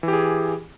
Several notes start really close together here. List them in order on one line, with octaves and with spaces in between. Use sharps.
E3 G4 G#4